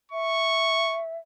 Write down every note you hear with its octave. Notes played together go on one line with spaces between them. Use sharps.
E5 C#6